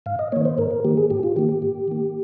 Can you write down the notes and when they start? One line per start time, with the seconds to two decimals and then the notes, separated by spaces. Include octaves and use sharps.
0.06 G#2 F5
0.19 D#5
0.32 D#3 A#3 C#5
0.45 C5
0.58 G#2 A#4
0.71 A#4
0.84 D#3 A#3 G4
0.97 G#4
1.10 G#2 G4
1.23 F4
1.36 D#3 A#3 G4
1.49 G4
1.62 G#2
1.88 D#3 A#3